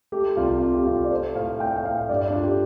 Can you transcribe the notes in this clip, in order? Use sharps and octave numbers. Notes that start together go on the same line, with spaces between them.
A3 G4
C2 F4
C3 F4
G4
C2 F4
D5
A3 C5
A2 F5
A3 G5
G5
A2 F5
G2 D5
D4
A3 F4
G4